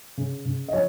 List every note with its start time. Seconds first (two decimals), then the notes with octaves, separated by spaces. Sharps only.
0.18 C#3
0.45 C#3
0.68 D#5
0.73 F3 C#5